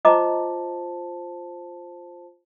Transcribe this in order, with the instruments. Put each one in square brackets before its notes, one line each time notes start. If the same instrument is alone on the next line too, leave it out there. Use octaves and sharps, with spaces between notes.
[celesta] F4 C5 A5 [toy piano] D#5 A#5 D6